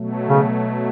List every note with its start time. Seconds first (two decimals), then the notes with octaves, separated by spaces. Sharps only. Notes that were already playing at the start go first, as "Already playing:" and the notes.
Already playing: B2 F#3 A3
0.29 C#3